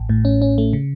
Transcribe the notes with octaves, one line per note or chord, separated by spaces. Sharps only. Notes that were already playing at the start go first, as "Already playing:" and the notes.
Already playing: A1
A2
C#4
C#4
A3
C#3